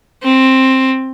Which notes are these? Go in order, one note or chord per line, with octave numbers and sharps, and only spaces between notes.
C4